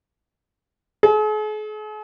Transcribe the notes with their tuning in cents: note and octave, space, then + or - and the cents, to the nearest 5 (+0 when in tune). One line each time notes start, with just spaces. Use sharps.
G#4 +45